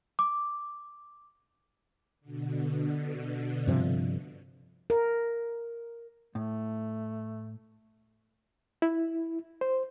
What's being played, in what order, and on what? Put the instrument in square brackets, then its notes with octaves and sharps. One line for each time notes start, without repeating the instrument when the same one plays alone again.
[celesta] D6
[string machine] B2 D3
[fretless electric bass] G2 C3 F3
[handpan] A#4
[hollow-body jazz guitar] A2 [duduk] A3
[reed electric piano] E4
C5